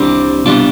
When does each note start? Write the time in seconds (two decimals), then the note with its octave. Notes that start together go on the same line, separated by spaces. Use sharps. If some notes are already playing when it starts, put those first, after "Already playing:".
Already playing: C2 C3 G3 C4 D4
0.46 C2 B2 G3 D4 F4